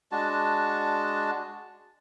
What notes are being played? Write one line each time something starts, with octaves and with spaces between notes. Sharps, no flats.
G#3 D4 F#4 A5